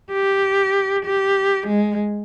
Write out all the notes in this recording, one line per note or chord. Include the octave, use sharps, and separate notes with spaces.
G4
G4
G#3